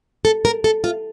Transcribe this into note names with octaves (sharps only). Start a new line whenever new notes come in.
A4
A#4
A4
F4